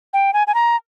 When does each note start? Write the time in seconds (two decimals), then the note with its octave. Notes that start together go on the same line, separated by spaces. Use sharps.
0.13 G5
0.33 G#5
0.47 G#5
0.54 A#5